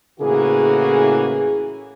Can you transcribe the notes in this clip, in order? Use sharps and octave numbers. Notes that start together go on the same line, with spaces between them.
A2 C#3 E3 A#3 F#4 G#4